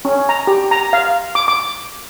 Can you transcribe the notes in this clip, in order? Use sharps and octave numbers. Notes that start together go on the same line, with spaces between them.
C#4
A#5
G4
A#5
F5
D6
D6